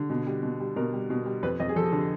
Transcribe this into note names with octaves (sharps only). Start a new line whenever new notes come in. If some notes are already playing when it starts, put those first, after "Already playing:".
Already playing: D3
B2
G3
B2
G3
B2 A#4
G3
B2
G3
F2 B4
F2 D#5
G#4
F3 A4
D3 A4